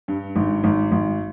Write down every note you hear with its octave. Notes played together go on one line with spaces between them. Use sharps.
G2
G#1
G#1
G#1